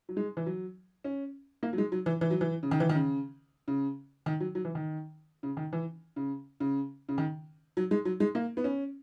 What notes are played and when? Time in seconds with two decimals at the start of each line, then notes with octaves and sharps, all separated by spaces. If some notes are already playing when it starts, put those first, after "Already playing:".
0.09 F#3
0.17 G#3
0.37 E3
0.46 F#3
1.04 C#4
1.63 A#3
1.73 F#3
1.78 G#3
1.92 F#3
2.06 E3
2.21 E3
2.30 F#3
2.41 E3
2.63 C#3
2.71 D#3
2.80 E3
2.89 D#3
2.95 C#3
3.68 C#3
4.26 D#3
4.40 F#3
4.55 F#3
4.65 E3
4.75 D#3
5.43 C#3
5.57 D#3
5.73 E3
6.16 C#3
6.60 C#3
7.09 C#3
7.18 D#3
7.77 F#3
7.91 G#3
8.05 F#3
8.20 G#3
8.35 A#3
8.57 B3
8.64 C#4